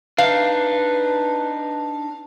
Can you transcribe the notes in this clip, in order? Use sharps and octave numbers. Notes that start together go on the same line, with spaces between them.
D4 D#4 B4 F5